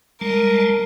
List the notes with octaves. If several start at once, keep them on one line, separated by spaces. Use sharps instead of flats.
G3 G#3 A#4 A5